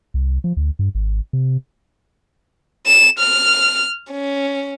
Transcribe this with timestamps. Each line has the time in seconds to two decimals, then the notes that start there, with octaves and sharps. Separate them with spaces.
0.14 C2
0.44 F3
0.57 D2
0.79 G2
0.95 G#1
1.33 C3
2.87 E7
3.19 F6
4.12 C#4